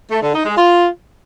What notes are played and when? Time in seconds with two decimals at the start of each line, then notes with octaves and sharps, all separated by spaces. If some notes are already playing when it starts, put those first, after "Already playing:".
0.10 A3
0.22 D3
0.34 D#4
0.45 G#3
0.57 F4